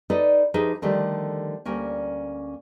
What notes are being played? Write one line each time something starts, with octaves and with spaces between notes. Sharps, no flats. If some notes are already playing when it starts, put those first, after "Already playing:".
D#4 A4 B4 D5 D#5
F3 D#4 G4 G#4 B4 E5
D3 D#3 F3 G3 A3 G4
D2 G3 A#3 C#4